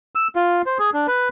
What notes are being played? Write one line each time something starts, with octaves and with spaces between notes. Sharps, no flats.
E6
F4
C5
G#4
D4
B4